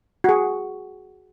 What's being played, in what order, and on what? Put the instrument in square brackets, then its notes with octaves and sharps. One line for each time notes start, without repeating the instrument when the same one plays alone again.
[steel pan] F#4 G#4